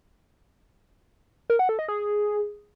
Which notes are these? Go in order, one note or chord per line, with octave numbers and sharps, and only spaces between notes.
A#4
F#5
A4
D#5
G#4